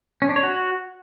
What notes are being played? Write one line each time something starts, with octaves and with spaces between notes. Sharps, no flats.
C#4
D4
C#5
F#4